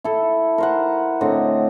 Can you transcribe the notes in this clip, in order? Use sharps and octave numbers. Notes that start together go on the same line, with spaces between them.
E4 A4
A#4 C5 F#5
A2 D3 C4 D#5